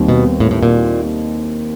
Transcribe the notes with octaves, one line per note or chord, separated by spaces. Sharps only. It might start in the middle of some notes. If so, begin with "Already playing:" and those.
Already playing: D#2 D#3 G3 C4 D#4
B2
A2
A2
A#2